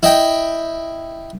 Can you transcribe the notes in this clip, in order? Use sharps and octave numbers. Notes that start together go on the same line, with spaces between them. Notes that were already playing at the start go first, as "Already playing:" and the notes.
E4 D#5 G5